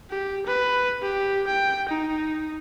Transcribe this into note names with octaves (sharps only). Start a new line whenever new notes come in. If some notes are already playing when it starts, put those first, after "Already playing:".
G4
B4
G4
G5
D#4